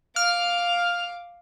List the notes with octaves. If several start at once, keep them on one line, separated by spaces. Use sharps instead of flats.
F5 D6 F6